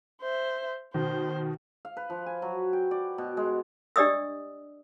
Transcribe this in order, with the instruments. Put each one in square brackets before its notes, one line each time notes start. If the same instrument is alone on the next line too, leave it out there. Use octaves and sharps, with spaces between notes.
[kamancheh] C5 E5
[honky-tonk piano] B2 D#3 [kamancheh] C5
[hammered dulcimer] F5
B4
F3
G#5
F#3
G5
D5
B2
G#3
[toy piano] D4 G4 D5 D#5 D#6 E6